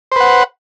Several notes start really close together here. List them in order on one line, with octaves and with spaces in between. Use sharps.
C5 B4 F#5